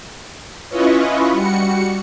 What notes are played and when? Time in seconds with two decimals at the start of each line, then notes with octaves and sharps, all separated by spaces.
0.68 C#4 E4 F4 B4 C#5 D#5
1.31 G3 F#4 C#7